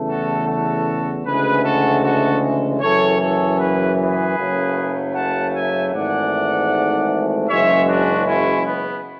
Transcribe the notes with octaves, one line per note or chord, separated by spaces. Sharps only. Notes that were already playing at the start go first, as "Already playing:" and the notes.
Already playing: E2 C#3 E3 A3
F#4 A4
F#4 A4
D2 C#3 E3 G#3 G#4 B4
F#4 A4
F#4 A4
F#1 F#2 E3 A4 C#5
A4 C#5
G#4 B4
G#4 B4
F#1 F#2 C#3 F#3 A3
F#5 A5
E5 G#5
G#1 G#2 E3 A3 D5 F#5
F#1 F#2 E3 G#3 C#5 E5
D4 F#4
C#4 E4
B3